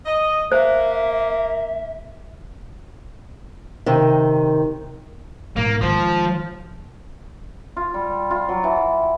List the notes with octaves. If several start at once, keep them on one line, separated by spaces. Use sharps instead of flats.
D#5
A#3 C5 E5
C3 D#3
G#2 B2 A#3
D#3 F3 G#3
F4
G3
F4
F#3
E3